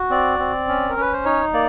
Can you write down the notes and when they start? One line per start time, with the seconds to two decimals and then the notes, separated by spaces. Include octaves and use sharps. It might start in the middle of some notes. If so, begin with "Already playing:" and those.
Already playing: F#4
0.10 C4 D5
0.39 C4
0.68 C#4
0.90 A#4
0.97 C#4 B4
1.13 C5
1.25 D#4 C#5
1.54 A#3 D5